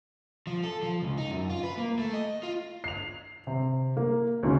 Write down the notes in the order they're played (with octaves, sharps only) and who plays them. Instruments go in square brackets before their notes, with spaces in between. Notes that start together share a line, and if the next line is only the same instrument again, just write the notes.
[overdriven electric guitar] F3
A4
F3
C#2
D#4
F#2
F4
B4
A#3
A3
D#5
F4
[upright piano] C7 F7
C3
A#3
D2 G#2 C#3 C#4